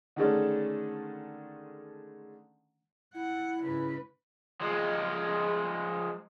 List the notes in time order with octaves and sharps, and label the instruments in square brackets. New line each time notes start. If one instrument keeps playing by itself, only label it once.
[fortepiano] D3 D#3 G#3 A3 C#4 D4
[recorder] E4 [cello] F#5
[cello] G#2 C#3 [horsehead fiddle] B4
[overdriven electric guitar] F3 G#3